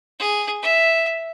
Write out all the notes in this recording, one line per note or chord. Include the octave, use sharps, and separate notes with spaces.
G#4
E5